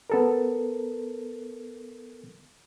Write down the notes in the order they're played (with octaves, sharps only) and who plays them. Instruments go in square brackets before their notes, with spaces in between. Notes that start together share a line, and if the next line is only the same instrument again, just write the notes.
[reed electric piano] B3 A4 A#4